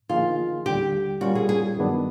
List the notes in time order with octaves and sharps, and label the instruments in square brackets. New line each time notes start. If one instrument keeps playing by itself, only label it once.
[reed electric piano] D3 F3 A#3 D#4 G#4 [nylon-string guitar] F4
[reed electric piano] D#2 D3 G3 [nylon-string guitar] G4
[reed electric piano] A#2 G3 A#3 C#4 F4 [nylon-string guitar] F#4
[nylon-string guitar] G#4
G#4
[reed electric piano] G2 D#3 F#3 B3 D4